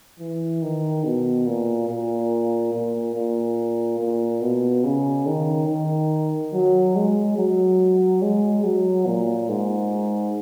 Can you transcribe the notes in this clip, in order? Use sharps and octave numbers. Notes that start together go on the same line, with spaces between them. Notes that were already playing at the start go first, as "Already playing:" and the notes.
E3
D#3
B2
A#2
A#2
A#2
A#2
A#2
B2
C#3
D#3
D#3
F#3
G#3
F#3
G#3
F#3
A#2
G#2